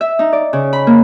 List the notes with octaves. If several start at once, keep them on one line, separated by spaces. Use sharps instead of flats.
E5
D#4
D5
C#3
B5
A#3